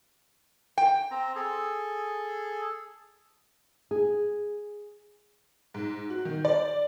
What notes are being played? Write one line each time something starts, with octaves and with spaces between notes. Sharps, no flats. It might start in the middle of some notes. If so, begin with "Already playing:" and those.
G5
C4 A#5
G#4 A4
G#4
G#2
F#4
D#3
D5